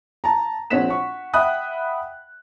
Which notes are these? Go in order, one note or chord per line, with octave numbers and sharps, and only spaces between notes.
A5 A#5
A#1 C4 C#5 F#5 B6 E7
F#5 C#6
E5 F#5 G5 B5 D#6 F#6